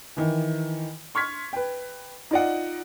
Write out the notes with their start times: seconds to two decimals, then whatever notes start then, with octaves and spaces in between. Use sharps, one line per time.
0.17 D#3 E3
1.15 C6 C#6 F6 G#6 B6
1.53 B4 G5
2.31 D#4 F4 D5 D#5 F#5